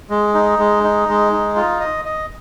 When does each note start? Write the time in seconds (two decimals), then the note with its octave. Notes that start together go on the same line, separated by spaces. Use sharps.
0.10 G#3
0.34 D#4
0.59 G#3
0.84 D#4
1.08 G#3
1.33 D#4
1.56 F4
1.80 D#5
2.05 D#5